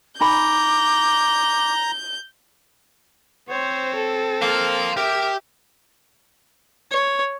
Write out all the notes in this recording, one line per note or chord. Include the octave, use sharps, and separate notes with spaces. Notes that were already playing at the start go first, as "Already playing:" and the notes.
D#4 G#5 A#5 B5 D6 G6
C4 C5 C#5
A4
A#3 C5 F5
G4 A#4 E5
C#5